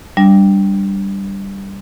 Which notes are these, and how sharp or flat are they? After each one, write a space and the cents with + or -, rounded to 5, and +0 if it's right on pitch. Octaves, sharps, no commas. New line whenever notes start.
G3 +0 D4 +0